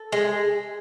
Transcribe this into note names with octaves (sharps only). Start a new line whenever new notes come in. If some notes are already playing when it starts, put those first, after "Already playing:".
Already playing: A4
G#3